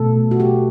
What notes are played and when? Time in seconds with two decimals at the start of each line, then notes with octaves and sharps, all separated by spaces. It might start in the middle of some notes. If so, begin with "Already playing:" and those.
Already playing: B2 A3 A4
0.31 F#4
0.40 G4